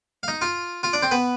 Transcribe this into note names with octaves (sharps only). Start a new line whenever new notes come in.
F5
D#4 D#5
F4 F5
F4 F5
D4 D5
C4 C5
B3 B4